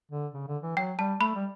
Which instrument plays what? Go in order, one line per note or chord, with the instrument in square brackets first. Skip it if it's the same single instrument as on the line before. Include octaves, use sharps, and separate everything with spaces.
[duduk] D3
C#3
D3
E3
[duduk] F#3 [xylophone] G5
[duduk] G3 [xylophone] A5
[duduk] A3 [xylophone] B5
[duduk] G3